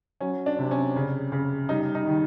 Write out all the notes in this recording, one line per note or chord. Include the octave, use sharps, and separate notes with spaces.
F#3 C#4
D4
C3
C#4
C#3
C#3
G3 D#4
D#4
D#3